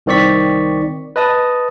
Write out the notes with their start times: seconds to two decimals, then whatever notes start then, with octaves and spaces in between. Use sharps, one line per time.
0.06 C2 D#3 C4 D5 C#6 B6
1.16 B4 D#5 A5 D#6